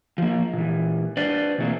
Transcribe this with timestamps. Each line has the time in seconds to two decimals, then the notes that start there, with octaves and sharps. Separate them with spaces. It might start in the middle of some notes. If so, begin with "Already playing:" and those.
0.18 F3 A#3
0.53 A#2 E3
1.17 D4 B4 C5 D5
1.58 B2 E3 A3 A#3 C4